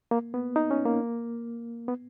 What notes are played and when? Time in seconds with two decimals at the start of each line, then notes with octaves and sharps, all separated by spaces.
0.11 A#3
0.34 B3
0.56 D#4
0.71 C#4
0.85 A#3
1.88 B3